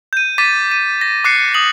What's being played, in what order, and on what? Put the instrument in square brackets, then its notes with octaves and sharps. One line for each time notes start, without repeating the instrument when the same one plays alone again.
[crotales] G6 D#7
D6 A6 B6 D#7
D#7
A#6
D6 F#6 C7 C#7
D#6 F#7